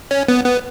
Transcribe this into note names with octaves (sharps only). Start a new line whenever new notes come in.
C#4
B3
B3